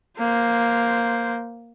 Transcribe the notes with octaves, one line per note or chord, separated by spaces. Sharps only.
A#3 C5